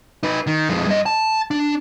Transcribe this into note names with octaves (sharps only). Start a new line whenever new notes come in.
D#4 B4
D#3
F2 G#3
G2 D#5
A5
D4